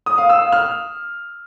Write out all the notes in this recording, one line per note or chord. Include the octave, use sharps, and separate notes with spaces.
D#6
F5
E6
F5
F6